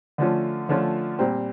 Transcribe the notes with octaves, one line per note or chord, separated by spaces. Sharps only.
D3 F3 A3 C#4 F4
D3 F3 A3 C#4 F4
A#2 G3 C4